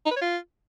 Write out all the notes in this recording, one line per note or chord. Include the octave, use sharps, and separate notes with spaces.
D#4
B4
C#5
F4